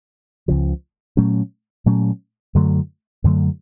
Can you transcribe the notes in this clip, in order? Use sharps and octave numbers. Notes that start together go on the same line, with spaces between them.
C#2 C#3 F3
A#2 F#3 A3 C#4
A#2 F#3 A3 C#4
F#2 D3 F#3 A3
F#2 D3 F#3 A3